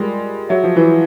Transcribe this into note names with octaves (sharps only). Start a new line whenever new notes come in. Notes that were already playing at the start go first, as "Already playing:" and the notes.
Already playing: G3 G#3 F4 A#4 D5 G5 C6
F#3 G#4 C#5 E5
F3
E3